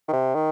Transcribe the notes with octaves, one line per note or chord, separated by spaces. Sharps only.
D#3
C3
D#3